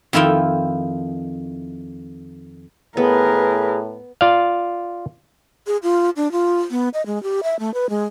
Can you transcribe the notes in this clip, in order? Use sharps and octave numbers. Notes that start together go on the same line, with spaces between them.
F2 D#3 E4 F4 G5
A2 B3 G#4 A#4 B4
F4 D5 F5
G#4
F4
D4
F4
B3
D#5
G#3
G4
E5
A3
B4
G#3